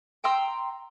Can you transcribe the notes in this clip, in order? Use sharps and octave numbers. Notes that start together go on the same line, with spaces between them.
G5 A#5 C6 E6